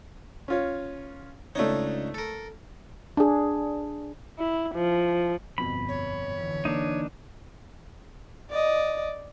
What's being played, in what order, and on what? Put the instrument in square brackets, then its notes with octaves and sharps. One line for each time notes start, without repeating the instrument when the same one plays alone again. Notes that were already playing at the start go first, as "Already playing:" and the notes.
[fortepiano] C#4 F4 C#5
[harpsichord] C#2 D4 D#4 [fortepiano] A3 C#5
[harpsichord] A4 A#4
[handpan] D4 G#4
[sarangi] E4
F3
[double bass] G1 [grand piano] F2 B2 [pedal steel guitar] B5
[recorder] C#5
[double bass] D3 E3
[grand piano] A#3 [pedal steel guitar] D4 D#4
[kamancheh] D5 D#5